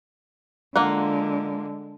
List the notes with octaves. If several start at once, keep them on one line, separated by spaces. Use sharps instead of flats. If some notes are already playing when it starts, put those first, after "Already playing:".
D3 G#3 A#3 F4 F#5